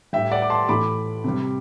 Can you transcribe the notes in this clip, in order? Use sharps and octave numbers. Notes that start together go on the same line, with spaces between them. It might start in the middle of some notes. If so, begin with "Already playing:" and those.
A2 G3 E5 G5
D5 F#5
D6
A5 C6
A2 E3 A3 B5 D6
C3 G3